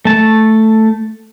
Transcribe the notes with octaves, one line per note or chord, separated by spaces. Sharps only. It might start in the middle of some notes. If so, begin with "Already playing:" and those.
A3 A5